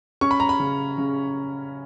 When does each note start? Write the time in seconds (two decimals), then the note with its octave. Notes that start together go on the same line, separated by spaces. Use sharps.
0.21 C#4 C#6
0.31 B5
0.40 A#5
0.49 B5
0.60 C#3
0.98 C#3